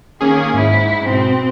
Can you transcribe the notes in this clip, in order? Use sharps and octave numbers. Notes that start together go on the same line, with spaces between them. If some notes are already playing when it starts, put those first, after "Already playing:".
D#3 A#3 C#4 G#4
G#2 E4
B2 C4